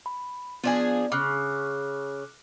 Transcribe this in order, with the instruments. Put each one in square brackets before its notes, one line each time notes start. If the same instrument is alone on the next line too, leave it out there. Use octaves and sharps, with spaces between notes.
[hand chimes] B5
[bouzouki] F3 D4 G#4 [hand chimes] B3
[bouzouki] C#3 [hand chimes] D6 F6 F#6